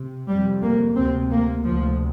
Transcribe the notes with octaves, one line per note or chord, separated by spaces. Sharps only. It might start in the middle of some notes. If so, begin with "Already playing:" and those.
Already playing: C3
F2 C3 G3
A#3
D2 C3 C4
A#3
D2 C3 F3